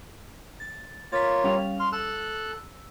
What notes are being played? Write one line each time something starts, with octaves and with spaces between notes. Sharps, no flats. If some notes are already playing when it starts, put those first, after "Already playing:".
A6
A#3 F4 C#5 A6 B6
G3 C#4 F5
C6 F6
A4 E6 F#6